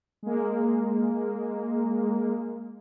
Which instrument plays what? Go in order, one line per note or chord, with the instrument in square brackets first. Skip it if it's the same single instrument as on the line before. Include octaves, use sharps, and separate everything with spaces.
[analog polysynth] G#3 A#3